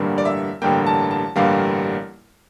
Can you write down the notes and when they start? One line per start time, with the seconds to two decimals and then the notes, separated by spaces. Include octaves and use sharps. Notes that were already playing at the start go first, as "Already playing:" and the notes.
Already playing: A1 G2 D3 G3 A#3
0.18 D5
0.25 E5
0.62 A1 G2 D3 G3 A#3 G5
0.87 A5
1.11 A5
1.36 A1 G2 D3 G3 A#3 F5